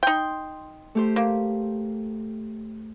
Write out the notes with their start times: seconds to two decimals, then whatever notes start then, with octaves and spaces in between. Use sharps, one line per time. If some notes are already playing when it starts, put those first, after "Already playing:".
0.03 D#4 G5 C6
0.95 A3 G4 C5
1.16 A#3